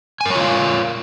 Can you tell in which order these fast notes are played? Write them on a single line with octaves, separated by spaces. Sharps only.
G#5 A#4 C#5 F4 F5